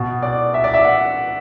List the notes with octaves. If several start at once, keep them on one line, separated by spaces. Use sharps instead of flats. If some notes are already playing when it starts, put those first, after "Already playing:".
Already playing: B2
D5
E5
D5
E5
F#5